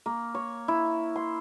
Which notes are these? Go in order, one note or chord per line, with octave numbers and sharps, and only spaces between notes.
A#3
C#5
E4
C6